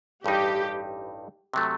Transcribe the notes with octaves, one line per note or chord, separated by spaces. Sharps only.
A1 G2 E3 G3 D#4 G4
C3 F#3 A3